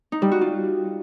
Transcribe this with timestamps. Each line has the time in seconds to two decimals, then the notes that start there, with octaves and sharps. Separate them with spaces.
0.12 D#4
0.22 G3
0.32 F#4
0.41 F4